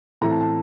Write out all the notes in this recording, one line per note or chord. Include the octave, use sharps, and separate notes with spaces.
A2 E3 A3 C4 E4 A#5
A5
A5